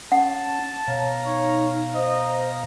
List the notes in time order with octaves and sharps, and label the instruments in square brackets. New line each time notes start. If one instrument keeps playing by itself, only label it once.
[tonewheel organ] C#4 [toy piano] F#5 [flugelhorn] A5
[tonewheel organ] B2 F5 A#5 [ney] C#5
[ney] D#4 [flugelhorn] C#5
[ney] C5 [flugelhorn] D#5